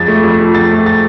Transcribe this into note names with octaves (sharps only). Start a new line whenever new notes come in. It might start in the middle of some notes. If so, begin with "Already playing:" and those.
Already playing: F2 G#3 A6
A3
F2
F3
F2 A6
A3
A6